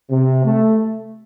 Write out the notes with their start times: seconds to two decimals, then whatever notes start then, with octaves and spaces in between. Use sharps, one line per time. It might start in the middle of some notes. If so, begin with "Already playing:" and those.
0.11 C3
0.45 A3